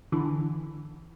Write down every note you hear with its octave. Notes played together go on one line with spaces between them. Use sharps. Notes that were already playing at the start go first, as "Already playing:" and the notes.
D3 E3